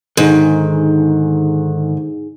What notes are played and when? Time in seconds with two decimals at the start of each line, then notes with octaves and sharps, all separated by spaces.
0.17 G#2 D3 D#3 D#4 G#4